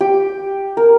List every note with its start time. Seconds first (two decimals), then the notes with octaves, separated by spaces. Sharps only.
0.01 G4
0.77 A#4